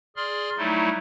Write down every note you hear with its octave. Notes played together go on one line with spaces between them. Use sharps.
G#4 D5 C6 F6
F#3 G3 A3 D#4 E4